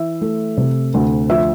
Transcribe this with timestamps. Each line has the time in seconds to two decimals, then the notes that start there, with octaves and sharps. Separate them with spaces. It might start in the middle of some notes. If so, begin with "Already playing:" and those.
Already playing: E3 E5
0.21 A3
0.57 C3
0.94 D2
1.30 F3 E5